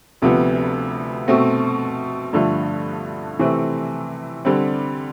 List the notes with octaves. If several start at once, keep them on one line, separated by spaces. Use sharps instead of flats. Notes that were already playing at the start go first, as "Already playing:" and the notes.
D2 C3 F3 B3
B2 A3 C4
G2 D3 F3 A3
C3 E3 A3 C4
D3 G3 C4